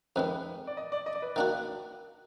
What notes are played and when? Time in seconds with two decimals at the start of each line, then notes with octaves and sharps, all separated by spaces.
0.16 F2 D#3 G#3 B4
0.67 D5
0.77 D#5
0.92 D5
1.06 D#5
1.15 D5
1.22 B4
1.36 D#3 A#3 D4 F#4